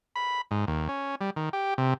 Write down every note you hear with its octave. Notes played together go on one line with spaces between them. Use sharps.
B5
G#2
D#2
C#4
G3
D#3
G4
C3